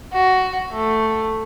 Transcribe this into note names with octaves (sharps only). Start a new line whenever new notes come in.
F#4
A3